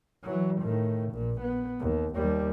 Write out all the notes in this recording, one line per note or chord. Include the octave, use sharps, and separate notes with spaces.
E3 F#3
A2 D#3
A#1 A#2
B3
D#2
D#2 G3